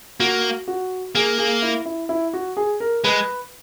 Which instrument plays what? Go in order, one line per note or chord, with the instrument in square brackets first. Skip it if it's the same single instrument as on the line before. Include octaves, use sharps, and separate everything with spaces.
[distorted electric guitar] A#3 [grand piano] F#4
[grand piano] F#4
[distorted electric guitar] A#3 [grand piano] G#4
[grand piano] G#4
E4
E4
E4
F#4
G#4
A#4
[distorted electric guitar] G#3 [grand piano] B4